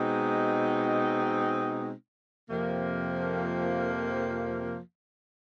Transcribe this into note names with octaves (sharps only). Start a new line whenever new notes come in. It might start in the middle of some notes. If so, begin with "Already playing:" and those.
Already playing: B2 G#3 C4 D#4
F2 C3 F3 A#3